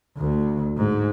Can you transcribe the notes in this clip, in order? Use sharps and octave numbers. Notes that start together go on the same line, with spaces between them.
D2
G#2